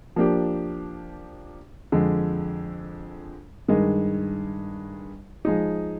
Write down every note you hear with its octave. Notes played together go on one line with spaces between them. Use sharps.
F3 A#3 D4 G4
F2 D3 G#3
G2 D#3 G#3
F3 G#3 D#4